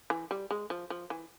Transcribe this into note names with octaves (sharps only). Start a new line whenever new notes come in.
E3
G3
G#3
F3
F3
E3